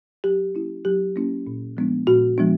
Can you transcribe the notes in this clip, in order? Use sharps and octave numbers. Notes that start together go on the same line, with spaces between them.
F#3 G4
A#3 C#4 E4
F#3 G4
A#3 C#4 E4
A#2
F3 G#3 B3 D4
A#2 F#4
F3 G#3 B3 D4